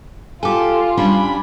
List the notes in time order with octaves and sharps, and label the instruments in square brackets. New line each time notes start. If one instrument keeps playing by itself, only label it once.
[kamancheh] F4 [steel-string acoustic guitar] G4 A4 [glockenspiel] G#5 D6
[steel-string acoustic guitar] G3 C#4 D4 [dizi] B5